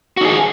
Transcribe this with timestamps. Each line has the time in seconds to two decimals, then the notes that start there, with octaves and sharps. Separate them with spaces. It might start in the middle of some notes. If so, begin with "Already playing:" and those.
0.17 F#4
0.21 D#4
0.25 G#4